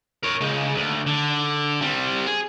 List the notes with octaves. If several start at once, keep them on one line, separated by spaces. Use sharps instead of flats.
A#4 C#5
C#3 G#3
D2
D3
G3 C4
G#4